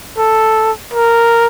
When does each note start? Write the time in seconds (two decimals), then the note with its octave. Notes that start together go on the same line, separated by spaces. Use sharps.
0.18 A4
0.94 A#4